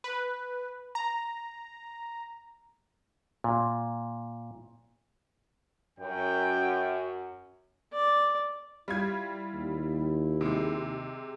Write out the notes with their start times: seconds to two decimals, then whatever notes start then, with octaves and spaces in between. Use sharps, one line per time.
0.04 B4
0.95 A#5
3.44 A#2
5.99 F#2 G5
7.93 D5
8.88 G3 E4 F4 G#6
9.54 D#2
10.41 C3 G#3